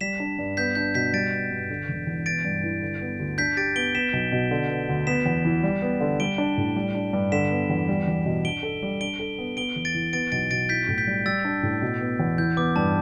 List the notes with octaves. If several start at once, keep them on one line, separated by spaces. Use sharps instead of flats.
G3 B6 E7
D4
G2
B3 G6 B6
D4 G6
B2 G6 B6
G3 A6 D7
B3
G2
D3
E1
E2
B3 A6 D7
G2
E3
D3
B3
D2
D4 G6 B6
G4 A6 D7
B3 D7 G7
B3 B6 E7
B1
B2
D3
B3
D2
B3 B6 E7
E2
E3
G3
B3
D3
G3 D7 G7
D4
A2
G3
D4
G2
D3 B6 E7
B3
E2
G3
E2
B2
D4 D7 G7
A4
G3
D4 D7 G7
A4
B3
B3 D7 G7
E2
A6 D7
E3
B3 A6 D7
B1 A6 D7
B2 A6 D7
E4 G6 B6
A2
G6 B6
G3
G3 E6 A6
D4
A2
B2
B3
E2
E3 G6
B3 D6
G2 A5